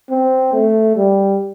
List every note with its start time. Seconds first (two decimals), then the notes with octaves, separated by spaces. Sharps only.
0.10 C4
0.53 A3
0.96 G3